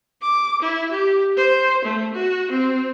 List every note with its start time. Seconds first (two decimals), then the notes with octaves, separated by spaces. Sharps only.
0.22 D6
0.62 E4
0.91 G4
1.37 C5
1.85 A3
2.14 F#4
2.51 C4